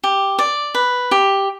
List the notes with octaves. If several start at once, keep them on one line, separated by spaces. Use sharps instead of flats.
G4
D5
B4
G4